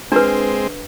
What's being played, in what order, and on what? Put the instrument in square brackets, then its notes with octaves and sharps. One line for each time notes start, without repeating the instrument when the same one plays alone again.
[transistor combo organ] G#3 C4 [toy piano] D4 B4